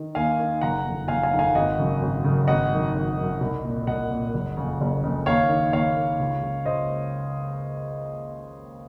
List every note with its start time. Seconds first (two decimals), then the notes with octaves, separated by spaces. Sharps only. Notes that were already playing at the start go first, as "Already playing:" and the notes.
Already playing: D#3
0.15 D#2 F5 G#5
0.39 D#3
0.61 F#1 F#5 A#5
0.85 F2 D#3
1.08 F#1 F5 G#5
1.23 F5 G#5
1.31 F2 D#3
1.39 F5 G#5
1.55 G#1 D#5 F#5
1.79 F#2 C#3
2.01 G#1
2.24 F#2 C#3
2.47 G#1 D#5 F#5
2.71 F#2 D#3
2.95 G#1
3.17 F#2 D#3
3.41 C2
3.63 A#2
3.87 C2 D#5 F#5
4.11 A#2
4.34 F#1
4.57 F2 C#3
4.81 F#1
5.04 F2 C#3
5.26 D#2 C#5 F5
5.49 D#3
5.73 D#2 C#5 F5
5.97 D#3
6.19 C#2
6.43 C#3
6.65 C#2 C5 D#5